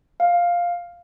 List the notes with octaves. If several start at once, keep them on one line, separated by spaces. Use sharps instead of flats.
F5